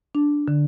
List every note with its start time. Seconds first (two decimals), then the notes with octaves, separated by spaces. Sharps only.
0.15 D4
0.48 D3